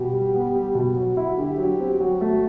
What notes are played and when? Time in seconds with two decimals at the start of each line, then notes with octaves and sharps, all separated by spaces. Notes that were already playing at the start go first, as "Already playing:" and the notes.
Already playing: B2 G4
0.13 G3
0.35 B3
0.55 G3
0.75 B2 F#4
0.96 F#3
1.17 E4
1.37 D3 G4
1.58 F#3
1.80 C4
1.99 F#3 F#4
2.21 A3